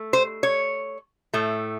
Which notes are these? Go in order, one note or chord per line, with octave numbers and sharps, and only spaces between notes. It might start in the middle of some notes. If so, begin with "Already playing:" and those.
Already playing: A3
C5
C#5
A2 A3